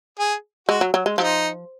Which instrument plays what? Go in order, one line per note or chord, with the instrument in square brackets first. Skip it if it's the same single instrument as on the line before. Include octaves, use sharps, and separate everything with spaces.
[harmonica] G#4
[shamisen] G#3 [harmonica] F#4
[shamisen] F#3
F#3
G#3
[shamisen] F3 [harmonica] D#4